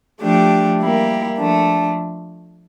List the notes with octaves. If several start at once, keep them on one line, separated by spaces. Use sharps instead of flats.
F3 A3 D4 G4
G3 A#3 E4 G4 A#4
F3 A3 D4